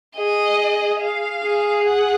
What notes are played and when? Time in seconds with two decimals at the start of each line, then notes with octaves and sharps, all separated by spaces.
0.16 G#4 D#5
1.01 F5
1.43 G#4
1.85 F#5